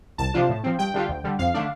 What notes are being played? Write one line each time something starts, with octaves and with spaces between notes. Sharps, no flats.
C2 A5
C3 F3 D4 F4
A2
F3 C4
G2 G5
D3 G3 D4 F4
D2
D3 G3
F2 F5
D3 A3 D4